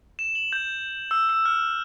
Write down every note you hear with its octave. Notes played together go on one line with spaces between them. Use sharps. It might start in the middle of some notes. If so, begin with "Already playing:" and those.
E7
F#7
G6
E6
E6
F6